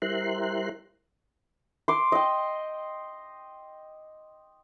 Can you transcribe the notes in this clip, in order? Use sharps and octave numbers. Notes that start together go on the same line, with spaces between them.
G3 E4 A#4 C5 C6 F#6
C6 D6
D#5 G5